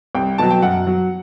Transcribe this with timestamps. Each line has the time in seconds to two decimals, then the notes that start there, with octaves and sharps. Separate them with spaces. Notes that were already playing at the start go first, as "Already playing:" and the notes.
0.15 C2 G5
0.38 B2 F#3 A5
0.50 G5
0.62 F#2 F#5
0.87 F#3